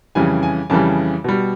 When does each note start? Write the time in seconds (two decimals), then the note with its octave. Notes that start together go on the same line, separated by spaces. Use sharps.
0.15 F2 C#3 E3 G3 G#5
0.43 G#5
0.70 F2 C#3 E3 G3 A5
1.24 B2 G3